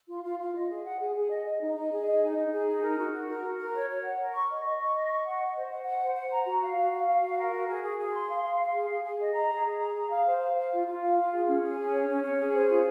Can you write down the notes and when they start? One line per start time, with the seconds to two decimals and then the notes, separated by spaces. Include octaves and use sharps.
0.09 F4
0.24 F4
0.40 F4
0.55 D#5
0.69 G#4
0.85 F#5
1.00 G#4
1.16 G#4
1.30 D#5
1.46 D#5
1.61 D#4
1.75 D#5
1.92 G#4
2.06 D#5
2.21 D#4
2.37 D#4
2.52 G#4
2.67 D#4
2.82 A#4
2.97 F#4
3.13 F#4
3.28 A#4
3.43 F#4
3.58 A#4
3.73 C#5
3.89 C#5
4.03 F#5
4.19 A#4
4.34 C#6
4.49 D#5
4.64 D#5
4.79 C#6
4.95 D#5
5.10 C#6
5.25 F#5
5.40 D#5
5.55 C5
5.70 F#5
5.85 F#5
6.01 C5
6.16 F#5
6.31 A#5
6.46 F#4
6.62 F5
6.77 F#4
6.92 F5
7.07 F5
7.22 F#4
7.37 A#4
7.53 F#4
7.67 G#4
7.83 G#4
7.98 G#4
8.13 C6
8.29 F5
8.43 F5
8.59 F5
8.74 G#4
8.90 G#4
9.04 G#4
9.20 D#5
9.34 A#5
9.51 G#4
9.65 G#4
9.80 A#5
9.95 G#4
10.11 F5
10.25 C5
10.41 F5
10.56 F5
10.72 F4
10.87 F4
11.01 F5
11.17 F4
11.32 G#4
11.47 C#4
11.63 G#4
11.78 C#4
11.93 C#5
12.08 C#4
12.23 C#4
12.38 G#4
12.53 C5
12.68 F4